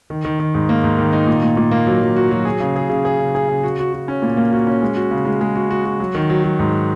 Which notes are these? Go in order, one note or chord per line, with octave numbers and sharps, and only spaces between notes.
D#3
D#3
D#3
G#2
A#3
G#2
D#3
D#4
A#2
A#2
A#2
A#3
F#3
F#3
F#4
F#3
G#4
C#3
G#4
C#3
G#4
C#3
G#4
C#3
F#4
F#4
F#4
C#4
A#2
A#3
F#4
C#4
G#3
F#4
C#3
G#3
G#3
F#4
F#4
F#4
F#3
D#3
F#3
F#3
G#2